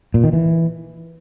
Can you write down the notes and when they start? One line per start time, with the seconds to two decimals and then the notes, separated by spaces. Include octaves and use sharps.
0.14 A#2
0.24 D#3
0.33 E3